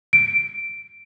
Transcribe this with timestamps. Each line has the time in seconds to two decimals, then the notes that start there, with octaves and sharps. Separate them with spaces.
0.13 D7